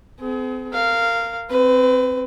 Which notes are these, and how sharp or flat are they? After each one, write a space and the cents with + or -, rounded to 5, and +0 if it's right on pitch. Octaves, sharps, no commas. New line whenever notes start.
C4 -40 G#4 +35
A#4 -20 F5 -10
C4 +0 B4 +30